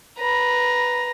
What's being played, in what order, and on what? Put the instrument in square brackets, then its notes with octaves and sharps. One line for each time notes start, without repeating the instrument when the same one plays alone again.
[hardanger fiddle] B4 A#5